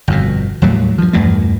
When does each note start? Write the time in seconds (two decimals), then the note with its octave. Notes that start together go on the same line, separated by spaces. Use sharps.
0.08 G1 F2 B2
0.62 D#2 A2 F#3 G3
0.98 G2 F3
1.13 E2 G2 A#2 A3